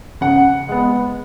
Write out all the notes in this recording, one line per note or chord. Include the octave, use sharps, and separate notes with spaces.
C#3 F#5
G#3 B3